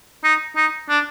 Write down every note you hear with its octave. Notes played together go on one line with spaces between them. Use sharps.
D#4
D#4
D4